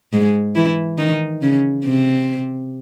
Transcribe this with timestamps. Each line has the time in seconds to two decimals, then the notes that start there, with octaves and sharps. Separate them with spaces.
0.13 G#2 G#3
0.55 E3 E4
0.98 D#3 D#4
1.42 C#3 C#4
1.84 C3 C4